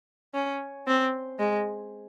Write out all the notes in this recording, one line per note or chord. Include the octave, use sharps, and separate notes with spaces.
C#4
C4
G#3